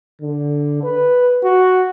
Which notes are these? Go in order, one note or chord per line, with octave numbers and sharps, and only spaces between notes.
D3
B4
F#4